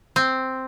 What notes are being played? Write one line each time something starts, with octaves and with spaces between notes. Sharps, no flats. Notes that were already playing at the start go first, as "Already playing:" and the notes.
C4